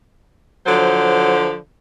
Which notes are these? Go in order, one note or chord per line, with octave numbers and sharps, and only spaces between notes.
D3 F3 F#3 C5